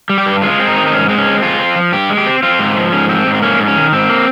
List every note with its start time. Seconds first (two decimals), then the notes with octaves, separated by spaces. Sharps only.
0.10 G3
0.18 G4
0.26 G2
0.42 G#3 F4
0.59 C4
0.68 D#4
0.76 D#3
0.86 D#4
0.92 G#2 C#4
1.09 G#3 C4
1.18 C#4
1.26 C4
1.43 G#3 F4
1.59 C4
1.76 F3
1.92 G2 G4
2.10 G#3
2.17 G4
2.26 C4
2.43 C4 F4
2.59 G#2
2.76 F3
2.92 G#2 C#4
3.09 C4
3.27 G#2
3.35 C4
3.42 A#3 C#4
3.59 G#2
3.68 C#4
3.76 D#3
3.92 G#2 C4
4.09 A#3